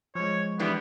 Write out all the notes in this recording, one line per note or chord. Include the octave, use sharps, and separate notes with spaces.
F3 G#3 C#5
D3 E3 G3 B3